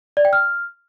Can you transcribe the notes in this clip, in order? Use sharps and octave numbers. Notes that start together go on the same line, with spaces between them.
D5
G5
F6